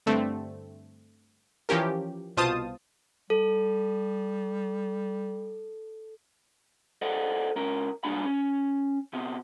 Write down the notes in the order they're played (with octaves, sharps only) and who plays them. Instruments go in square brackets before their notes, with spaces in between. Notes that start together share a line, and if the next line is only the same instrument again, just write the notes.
[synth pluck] G2 D3 A3 C4
E3 F3 C#4 G4 A#4
C2 B2 F4 C5 A5 D#6
[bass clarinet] G3 [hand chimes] A4
[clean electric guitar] A4 C5 D5 D#5 F#5
C#2 C#4 A#4
C2 G#2 G3 A#3 D4 B5
C#4
C3 B3 C4